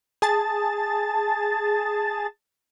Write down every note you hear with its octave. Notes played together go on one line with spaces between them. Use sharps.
G#4 A5 A6